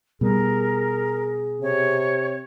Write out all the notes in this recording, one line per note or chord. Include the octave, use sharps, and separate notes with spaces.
B2 G3 G#4 A#4
C3 C#5